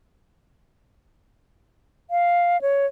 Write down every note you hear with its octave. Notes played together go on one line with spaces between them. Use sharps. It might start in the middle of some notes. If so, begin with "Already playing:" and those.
F5
C#5